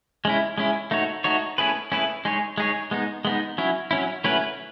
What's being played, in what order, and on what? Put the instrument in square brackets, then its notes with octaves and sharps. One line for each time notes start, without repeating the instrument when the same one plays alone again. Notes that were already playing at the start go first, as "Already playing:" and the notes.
[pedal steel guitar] G#3 C#4 E4
G#3 C#4 E4
A3 D#4 F#4 C#5
A3 D#4 F#4 C#5
A3 C#4 E4 G#4 B4
A3 C#4 E4 G#4 B4
G#3 D#4 G#4 C#5
G#3 D#4 G#4 C#5
G#3 B3 D#4
G#3 B3 D#4
F#3 C#4 E4
F#3 C#4 E4
F#3 A3 C#4 E4 B4